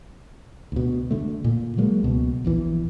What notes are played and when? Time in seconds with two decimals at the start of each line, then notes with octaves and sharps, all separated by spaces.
0.72 D2 B2
1.11 D3 A3
1.44 A#2
1.77 D3 F#3 G#3 A#3
2.03 C#2 B2
2.45 A#1 E2 E3